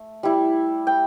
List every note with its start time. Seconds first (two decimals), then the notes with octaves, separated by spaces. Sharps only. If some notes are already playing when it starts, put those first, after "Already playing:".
Already playing: A3
0.23 G3 E4
0.87 G5